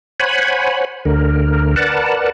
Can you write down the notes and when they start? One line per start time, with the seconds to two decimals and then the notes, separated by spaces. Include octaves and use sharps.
0.20 C5 C#5 F#5 G#5 B5
1.05 D2 D3 A#4
1.76 A#4 B4 D5 F#5 A5